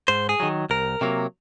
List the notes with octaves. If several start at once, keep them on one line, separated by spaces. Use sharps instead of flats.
G#2 C5
G#4
D#3 F#3
C2 A#4
C3 F#3 A#3